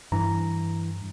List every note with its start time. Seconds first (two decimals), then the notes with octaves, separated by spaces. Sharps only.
0.12 G2 E3 A#5